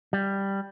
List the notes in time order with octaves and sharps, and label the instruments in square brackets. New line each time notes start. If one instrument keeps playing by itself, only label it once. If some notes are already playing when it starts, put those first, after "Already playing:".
[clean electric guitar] G3